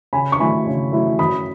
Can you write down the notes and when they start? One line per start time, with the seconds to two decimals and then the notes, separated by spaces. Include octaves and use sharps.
0.13 C#3 G#5 B5
0.32 C#6
0.39 F#3 A3 E4 G#5 B5
0.67 C#3
0.92 F#3 A3 E4
1.19 F#2 B5 D#6